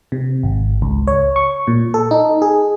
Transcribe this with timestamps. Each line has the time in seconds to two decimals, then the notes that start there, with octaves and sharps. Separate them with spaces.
0.12 C3
0.43 G#1
0.82 C#2
1.07 C#5
1.36 C#6
1.67 A#2
1.94 A4
2.11 D#4
2.42 G#4